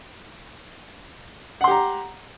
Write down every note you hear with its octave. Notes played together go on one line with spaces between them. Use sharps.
G4 F#5 A#5 C6